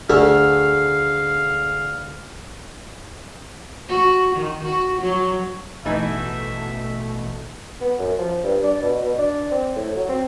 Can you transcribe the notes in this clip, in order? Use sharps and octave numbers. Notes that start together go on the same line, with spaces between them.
D2 A3 G#4 E5 F5
F#4
D#3
F#4
F#3
A1 B2 E3 A3 D#4 E5
B3
F#2
F3
G2
D4
B2
B2
D4
C4
A2
F#3
C4